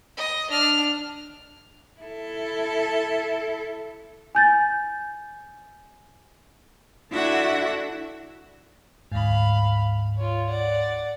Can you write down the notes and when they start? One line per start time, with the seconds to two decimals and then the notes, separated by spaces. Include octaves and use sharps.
0.17 D#5
0.50 D4 F6
2.01 E4 A4
4.35 G#5 G6 A6
7.11 D4 E4 F#4 A4 E5 F#5
9.12 D2 G#2 F5 B5
10.17 F4 C#5
10.49 D5 F#5